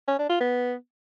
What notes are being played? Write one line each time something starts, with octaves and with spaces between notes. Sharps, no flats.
C#4
D4
F4
B3